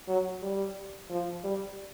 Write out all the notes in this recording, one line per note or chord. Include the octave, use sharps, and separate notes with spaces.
F#3
G3
F3
G3